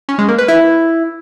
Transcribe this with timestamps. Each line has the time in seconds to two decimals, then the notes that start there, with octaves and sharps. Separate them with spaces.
0.09 C#4
0.19 G#3
0.28 A#3
0.38 B4
0.48 E4